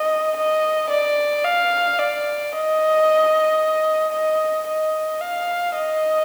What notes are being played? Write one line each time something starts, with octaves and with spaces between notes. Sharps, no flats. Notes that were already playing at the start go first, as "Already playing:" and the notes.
Already playing: D#5
D#5
D5
F5
D5
D#5
D#5
D#5
F5
D#5